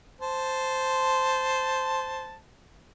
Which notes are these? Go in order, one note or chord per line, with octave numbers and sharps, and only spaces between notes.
C5 A5